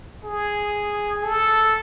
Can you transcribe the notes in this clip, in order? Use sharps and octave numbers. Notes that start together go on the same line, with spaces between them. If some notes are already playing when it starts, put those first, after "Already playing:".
G#4
A4